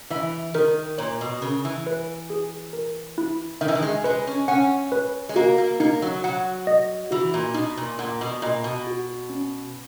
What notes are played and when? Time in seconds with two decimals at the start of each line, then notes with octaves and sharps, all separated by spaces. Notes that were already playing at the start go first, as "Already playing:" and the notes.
0.10 E3 E5
0.54 D#3 A#4
0.98 A#2 C#5
1.21 B2
1.42 C#3 A#4
1.65 E3
1.87 B4
2.30 G#4
2.73 A#4
3.18 E4
3.61 D#3 E5
3.68 E3
3.75 D#3
3.83 G#3
4.04 G#3 B4
4.27 C#4
4.48 C#4 F#5
4.92 B4
5.29 G#3
5.36 A#3 F#4
5.58 A#3
5.80 A#3 D#4
6.02 F#3
6.24 F#3 F#5
6.67 D#5
7.11 E3 F#4
7.34 A#2
7.54 B2 D#4
7.77 A#2
7.99 A#2 F#5
8.21 B2
8.42 A#2 D#5
8.64 B2
8.87 F#4
9.30 C#4